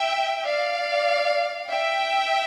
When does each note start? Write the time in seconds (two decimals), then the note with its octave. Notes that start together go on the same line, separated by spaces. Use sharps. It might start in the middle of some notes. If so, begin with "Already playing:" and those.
Already playing: E5 G5
0.45 D5 F5
1.69 E5 G5